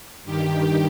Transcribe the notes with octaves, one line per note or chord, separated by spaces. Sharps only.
G2 D#3 G4